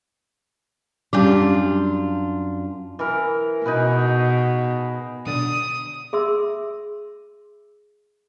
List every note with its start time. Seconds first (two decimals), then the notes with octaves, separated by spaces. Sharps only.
1.13 F#2 G3 C#4 D4 F4 G4
2.99 E3 E4 A#4
3.66 B2 D#4 G#4 B4
5.27 B2 D3 D5 D#6
6.13 G#4 E5 C6 E6